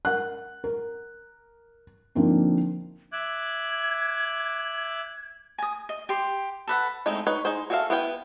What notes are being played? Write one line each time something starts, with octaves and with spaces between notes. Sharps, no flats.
A#4 F#5 F#6
A#4
D3 F3 A#3 C4 D4 D#4
E5 D6 F#6 G#6
G#5 D#6
D#5
G4 C6
A4 B4 F#5
G#3 A3 C4 D#4
D#4 B4 C#5
D#4 G#4 C5
F#4 G#4 A4 E5 F5
B3 E4 B4 F#5 G5